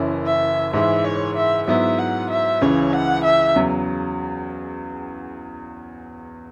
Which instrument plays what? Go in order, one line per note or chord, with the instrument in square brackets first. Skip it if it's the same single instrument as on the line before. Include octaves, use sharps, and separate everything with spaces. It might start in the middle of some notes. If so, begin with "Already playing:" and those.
Already playing: [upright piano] F#1 F#2 E3 C#4 E4
[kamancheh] E5
[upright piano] G#2 E3 G#3 E4 [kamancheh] E5
[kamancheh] C#5
E5
[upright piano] G#2 F#3 B3 E4 [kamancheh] E5
[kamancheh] F#5
E5
[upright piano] C#2 C#3 E3 [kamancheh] C#5
[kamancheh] F#5
E5
[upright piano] E2 C#3 F#3